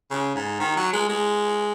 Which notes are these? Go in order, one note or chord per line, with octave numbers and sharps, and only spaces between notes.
C#3
G#2
D#3
F#3
G#3
G#3